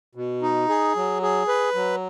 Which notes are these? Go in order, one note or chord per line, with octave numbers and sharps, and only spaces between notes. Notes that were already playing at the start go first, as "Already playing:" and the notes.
B2
D#4
G#4
F#3
G#4
B4
F#3